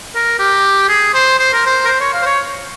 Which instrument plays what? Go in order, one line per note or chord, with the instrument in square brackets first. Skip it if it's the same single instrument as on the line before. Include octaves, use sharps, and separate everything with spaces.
[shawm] A#4
G4
G#4
C5
C5
A#4
C5
A#4
C5
C#5
F5
C5
C#5